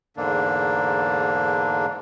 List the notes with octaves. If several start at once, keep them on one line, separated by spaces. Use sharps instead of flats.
E2 G#2 D3 A#3 D4